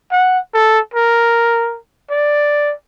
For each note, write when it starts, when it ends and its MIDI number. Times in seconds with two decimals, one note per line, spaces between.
0.11 0.39 78
0.54 0.79 69
0.94 1.78 70
2.11 2.73 74